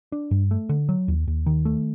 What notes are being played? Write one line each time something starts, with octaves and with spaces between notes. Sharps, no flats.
D4
G2
A3
D3
F#3
D#2
D#2
D#3
A3